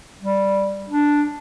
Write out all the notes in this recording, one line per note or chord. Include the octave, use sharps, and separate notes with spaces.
G3
D4